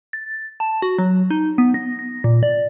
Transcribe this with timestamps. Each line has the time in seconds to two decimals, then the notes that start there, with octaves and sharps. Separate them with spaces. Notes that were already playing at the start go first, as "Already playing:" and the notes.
0.13 A6
0.60 A5
0.82 F#4
0.99 F#3
1.30 D#4
1.58 B3
1.74 A#6
1.99 A#6
2.24 A#2
2.43 D5